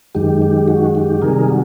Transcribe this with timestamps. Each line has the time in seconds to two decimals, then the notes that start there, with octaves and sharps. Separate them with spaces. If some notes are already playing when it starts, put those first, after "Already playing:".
0.15 F#2 D#3 G#3 G4
0.42 G4
0.68 F#4
0.95 G4
1.22 C3 D#3 G3 G#4 A#4
1.48 F#4